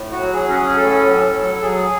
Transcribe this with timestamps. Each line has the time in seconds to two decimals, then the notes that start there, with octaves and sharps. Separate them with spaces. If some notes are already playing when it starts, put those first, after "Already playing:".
Already playing: A2
0.12 F#4
0.19 F#3
0.33 G#4
0.48 C#4 F#4
0.54 G#4
0.76 A2 A4
1.05 F#3
1.33 F#3
1.62 F#3 G#4